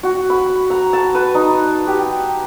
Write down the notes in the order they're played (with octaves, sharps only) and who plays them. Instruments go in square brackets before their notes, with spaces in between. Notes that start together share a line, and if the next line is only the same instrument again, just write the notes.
[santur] F#4
B5
A#5
A5
B4
D#4
G4